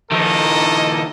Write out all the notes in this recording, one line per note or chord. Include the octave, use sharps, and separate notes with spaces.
D#3 F3 A#3 A4 D#5